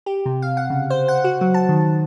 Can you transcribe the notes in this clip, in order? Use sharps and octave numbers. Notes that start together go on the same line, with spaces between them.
G4
C3
F5
F#5
C#3
C5
F#5
F#4
F#3
A5
D#3